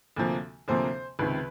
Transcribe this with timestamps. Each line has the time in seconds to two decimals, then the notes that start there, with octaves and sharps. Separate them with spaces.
0.16 D2 C3 F3 A#3
0.68 D2 C3 F3 A#3 C5
1.19 C#2 C3 D#3 B4